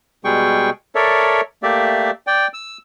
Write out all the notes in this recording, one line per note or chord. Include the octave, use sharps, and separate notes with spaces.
B2 G3 G#3 G#4 G5 C#6
A4 A#4 C#5 D5 E5
A3 A#3 G4 D5 E5
D5 G5
E6